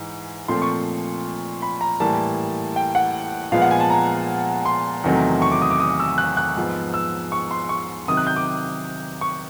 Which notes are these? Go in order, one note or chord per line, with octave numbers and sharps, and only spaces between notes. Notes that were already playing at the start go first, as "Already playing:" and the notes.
Already playing: G#2 E3
A#2 F3 A3 C4 C6
C#6
B5
A#5
A2 E3 G3 A#3 A5
G5
F#5
A#2 F3 G#3 B3 F5
F#5
G#5
A5
A#5
C6
E2 C3 D#3 F#3 A3
C#6
D6
D#6
D6
D#6
E6
F#6
F#6
G#2 F3 G#3 B3
E6
C#6
C6
C#6
C3 D#3 F#3 D#6
F#6
G6
D6
C#6